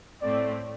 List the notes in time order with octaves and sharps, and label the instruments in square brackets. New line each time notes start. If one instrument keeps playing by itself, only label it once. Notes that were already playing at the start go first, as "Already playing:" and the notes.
[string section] A2 A3 C4 [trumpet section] D5